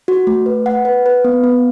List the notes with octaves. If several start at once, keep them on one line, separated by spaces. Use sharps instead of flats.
F#4
A3
B4
F#5
B4
B4
B3
B3